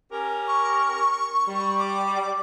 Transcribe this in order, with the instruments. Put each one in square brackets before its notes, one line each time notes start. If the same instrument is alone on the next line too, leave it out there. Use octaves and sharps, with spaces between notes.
[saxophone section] C#4 G4 A#4
[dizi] C#6
[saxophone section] G3
[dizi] D6